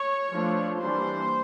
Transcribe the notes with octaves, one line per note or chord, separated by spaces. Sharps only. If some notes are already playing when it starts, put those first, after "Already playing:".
Already playing: C#5
F3 A3 D4
E3 G3 A#3 D4 C5